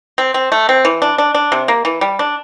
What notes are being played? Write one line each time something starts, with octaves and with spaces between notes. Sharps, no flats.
C4
C4
A3
C4
E3
D4
D4
D4
C3
A#3
E3
G3
D4